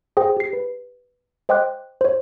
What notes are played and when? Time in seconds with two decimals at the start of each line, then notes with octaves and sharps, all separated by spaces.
0.17 G#4 C5 G5
0.37 G4 C7
0.53 B4
1.49 C5 D#5 G5 C6 D6 F#6
2.01 C5 C#5